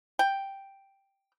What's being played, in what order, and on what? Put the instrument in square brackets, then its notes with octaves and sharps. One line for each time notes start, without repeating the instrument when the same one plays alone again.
[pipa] G5